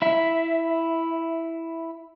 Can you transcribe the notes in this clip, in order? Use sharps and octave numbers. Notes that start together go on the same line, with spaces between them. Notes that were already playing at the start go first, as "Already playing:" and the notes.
E4 E5